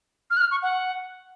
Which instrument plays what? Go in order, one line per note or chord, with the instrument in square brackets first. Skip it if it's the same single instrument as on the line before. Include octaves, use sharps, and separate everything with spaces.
[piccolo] F6
F#6
F6
C#6
F#5